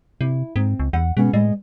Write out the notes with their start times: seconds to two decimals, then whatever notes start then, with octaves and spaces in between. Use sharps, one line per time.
0.21 C3 E4
0.56 G#2 C4
0.80 C#2
0.93 E2 F#5
1.17 B2 G#3 B3 C#4
1.33 A2 G#3 D#5